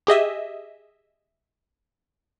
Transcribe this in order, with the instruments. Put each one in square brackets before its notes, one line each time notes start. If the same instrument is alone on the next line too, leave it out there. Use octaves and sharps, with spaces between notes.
[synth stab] G4 G#4 D#5 E5